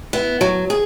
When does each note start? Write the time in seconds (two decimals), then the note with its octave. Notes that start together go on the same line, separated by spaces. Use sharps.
0.13 B3 E4
0.41 F#3
0.70 G#4